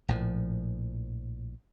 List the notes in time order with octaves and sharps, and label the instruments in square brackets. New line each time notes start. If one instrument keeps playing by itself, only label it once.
[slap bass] A#1 A2 F3